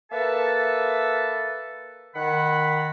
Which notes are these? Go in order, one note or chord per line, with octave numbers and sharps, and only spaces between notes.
A#3 A4 B4 E5 A5
D#3 F#5 B5